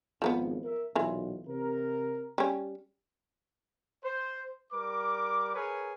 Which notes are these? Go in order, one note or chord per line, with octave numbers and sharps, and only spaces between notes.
G#1 F2 F3 A#3 B3
A#4 E5
B1 A#2 E3 F4
C3 A#4
G3 C#4
C5
G3 A#4 D6
G#4 A#4 B4 C#5